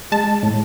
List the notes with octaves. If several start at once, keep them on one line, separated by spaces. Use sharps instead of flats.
G#3 A5
A2